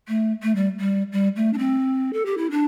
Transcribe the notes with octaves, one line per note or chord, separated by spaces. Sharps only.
A3
A3
G3
G3
G3
A3
D4
C4
A4
G4
E4
D4